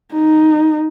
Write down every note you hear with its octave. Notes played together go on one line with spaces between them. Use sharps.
D#4